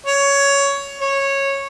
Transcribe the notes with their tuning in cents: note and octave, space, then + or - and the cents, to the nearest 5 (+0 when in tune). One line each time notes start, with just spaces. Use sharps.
C#5 +10
C#5 -10